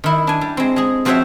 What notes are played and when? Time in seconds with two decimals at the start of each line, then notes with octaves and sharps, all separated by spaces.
0.04 D#3 E4
0.27 D4 G#5
0.41 G3
0.57 G#3 C4
0.76 G#3 G#4
1.05 F3 C4 F#4 C5 C#5 E5